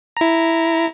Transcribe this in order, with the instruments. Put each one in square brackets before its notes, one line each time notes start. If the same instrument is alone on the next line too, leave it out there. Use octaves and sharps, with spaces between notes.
[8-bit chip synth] E4 A#5